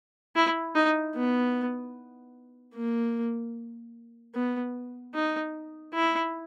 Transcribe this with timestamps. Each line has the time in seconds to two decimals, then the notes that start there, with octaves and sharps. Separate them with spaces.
0.36 E4
0.75 D#4
1.15 B3
2.74 A#3
4.34 B3
5.14 D#4
5.94 E4